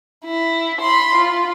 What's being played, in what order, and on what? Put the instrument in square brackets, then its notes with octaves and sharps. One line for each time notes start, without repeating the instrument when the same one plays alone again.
[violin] E4
B5 C6
F4